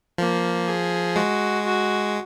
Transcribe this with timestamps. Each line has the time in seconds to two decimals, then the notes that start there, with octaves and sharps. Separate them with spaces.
0.18 F3 A#3
0.68 G#4
1.16 G#3 F#4
1.65 F#4